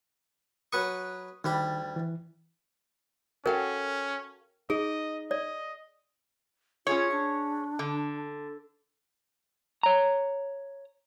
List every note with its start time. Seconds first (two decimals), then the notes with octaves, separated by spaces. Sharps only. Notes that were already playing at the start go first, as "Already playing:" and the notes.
0.73 F#3 B4 C#6 D#6
1.44 D2 D#3 G3 B5
1.96 E3
3.46 C#4 F#4 A4 A#4 F5 G5
4.70 D#4 G#4 D#5
5.31 D5 D#5
6.87 C#4 F4 G#4 C#5
7.11 D4
7.79 D3
9.83 C#5 A#5